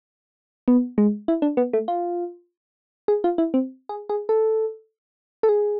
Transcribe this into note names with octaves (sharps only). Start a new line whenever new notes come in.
B3
G#3
E4
D4
B3
A3
F4
G#4
F4
E4
C4
G#4
G#4
A4
A4
G#4